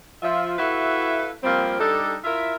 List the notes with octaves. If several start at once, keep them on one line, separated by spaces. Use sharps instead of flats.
F3 F4 E5
E4 F#4 A4 B4 E5 F5
F3 G3 A#3 C4
G3 D4 D#4 A4
E4 F4 A#4 E5